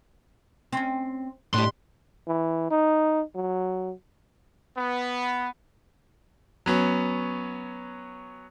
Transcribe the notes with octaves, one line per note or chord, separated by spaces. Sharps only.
C4 C#4
A2 D4 G4 C6
E3
D#4
F#3
B3
F#3 B3 C#4